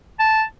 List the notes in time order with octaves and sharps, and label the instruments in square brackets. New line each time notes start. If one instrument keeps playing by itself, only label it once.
[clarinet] A5